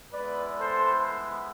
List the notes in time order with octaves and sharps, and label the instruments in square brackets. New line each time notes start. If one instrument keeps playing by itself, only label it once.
[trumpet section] G#3 B3 E4 B4 D5
A4 C5